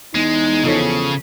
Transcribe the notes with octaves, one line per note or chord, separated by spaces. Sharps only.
E2 G#3 D#4
C#3 F3 C#4 A4 C#5